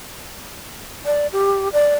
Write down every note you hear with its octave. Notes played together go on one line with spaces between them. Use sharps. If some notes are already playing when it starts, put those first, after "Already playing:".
D5
G4
D5